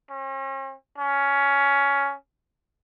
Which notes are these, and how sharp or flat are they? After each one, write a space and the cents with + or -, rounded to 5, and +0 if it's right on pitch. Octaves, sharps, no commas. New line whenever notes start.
C#4 -45
C#4 +15